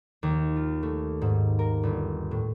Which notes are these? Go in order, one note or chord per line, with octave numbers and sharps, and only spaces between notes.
D#2
F4
A3
G#2
A#4
G1
A2